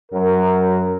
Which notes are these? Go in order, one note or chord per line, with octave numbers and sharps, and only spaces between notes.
F#2 F#3 A#4